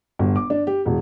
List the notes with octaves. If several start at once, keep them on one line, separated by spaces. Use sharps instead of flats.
G1
D6
D4
G4
E1